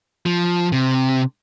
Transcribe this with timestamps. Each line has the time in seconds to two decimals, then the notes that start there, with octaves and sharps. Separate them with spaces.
0.26 F3
0.72 C3